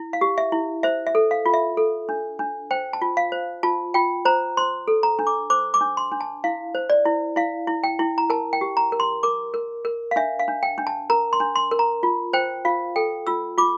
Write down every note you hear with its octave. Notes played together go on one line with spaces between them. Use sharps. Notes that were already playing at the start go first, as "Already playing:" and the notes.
Already playing: E4
F5
G4
E5
E4
C5 E5
E5
A4
F5
F4
E5
A4
D4
D4
C5 G5
A5
F4
F5
C5
F4 A5
F4 G5
C5 A#5
C5 C6
A4
A#5
D4
D6
C5 D6
D6
D4
C6
D4
A5
E4 F5
C5
D5
E4
E4 F5
E4
G5
E4
A#5
A#4 A5
G5
G4
A#5
A#4
C6
A#4 D6
A#4
A#4
F5
D4 E5
F5
D4
G5
D4
A5
A#4 A#5
C6
D4
C6
A#4
A#5
F4
C5 G5
F4 F5
A4 G5
F4 E6
F4 D6